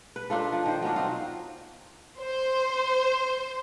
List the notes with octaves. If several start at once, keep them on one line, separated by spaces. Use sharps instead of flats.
B4
D4 D#4 F4 A4
F3
D#3 C5
F#3 B3 C#4 D4
C4 D#4 F4
C5